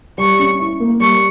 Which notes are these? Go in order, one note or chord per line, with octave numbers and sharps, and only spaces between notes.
G3 C#6
C#4
E4
A#3
G3 C#6